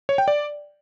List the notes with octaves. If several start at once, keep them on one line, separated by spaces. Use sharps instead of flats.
C#5
G5
D5